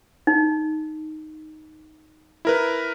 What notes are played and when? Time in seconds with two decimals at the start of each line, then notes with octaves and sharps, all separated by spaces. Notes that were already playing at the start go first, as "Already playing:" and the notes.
0.27 D#4
2.45 E4 A#4 B4